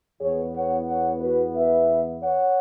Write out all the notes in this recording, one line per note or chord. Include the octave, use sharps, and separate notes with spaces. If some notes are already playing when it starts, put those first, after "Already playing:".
E2 E3 B3 G#4 C#5
C#5 F#5
C#5 F#5
F#4 B4
B4 E5
C#5 F#5